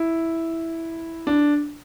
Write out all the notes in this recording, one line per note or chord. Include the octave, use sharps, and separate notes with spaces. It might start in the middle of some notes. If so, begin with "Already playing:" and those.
Already playing: E4
D4